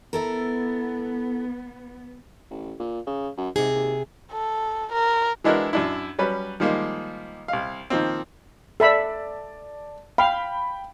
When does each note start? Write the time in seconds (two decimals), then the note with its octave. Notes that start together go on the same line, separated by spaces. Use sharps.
0.13 B3 E4 A4 A#4
2.50 A1
2.79 A#2
3.07 C#3
3.37 F#2
3.56 G#2 C3 G#4
3.74 D#2
4.32 A4
4.92 A#4
5.44 E3 G#3 D4 E4 F#4 A#4
5.73 F#2 D4 E4
6.18 F#3 G3 C#4 B4
6.60 D#3 F3 G3 G#3 A#3
7.48 C2 F5
7.90 D#3 F3 A#3 C4
8.80 A4 D5 E5 A5 B5
10.18 F5 G5 B5